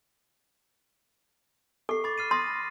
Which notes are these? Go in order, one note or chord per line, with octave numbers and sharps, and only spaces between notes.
A4 C#6 C7
B5 D6 A6
F6 C7 D#7
C6 D#6 A6 A#6